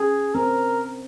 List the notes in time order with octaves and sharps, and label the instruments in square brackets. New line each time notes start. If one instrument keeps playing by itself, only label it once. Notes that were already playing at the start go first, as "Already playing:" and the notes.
Already playing: [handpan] C#4 [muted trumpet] G#4
[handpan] C4 [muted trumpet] A#4